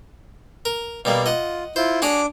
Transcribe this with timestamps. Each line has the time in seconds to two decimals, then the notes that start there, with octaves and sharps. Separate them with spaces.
0.65 A#4
1.05 B2 G3 A#3 D5 F5
1.26 F4 D#5 F#5
1.76 E4 F4 C5
2.02 D4 F#4 G#4 C#5 D6